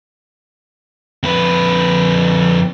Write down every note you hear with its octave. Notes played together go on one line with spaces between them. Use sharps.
F2 B4